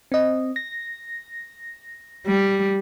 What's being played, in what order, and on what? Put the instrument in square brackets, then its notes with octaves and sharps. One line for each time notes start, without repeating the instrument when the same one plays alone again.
[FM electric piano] C4 D#5
A#6
[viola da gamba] G3